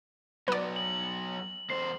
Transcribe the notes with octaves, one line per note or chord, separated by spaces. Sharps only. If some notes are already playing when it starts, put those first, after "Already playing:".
F#3 B3 B4 D5
F#7
E2 C5 C7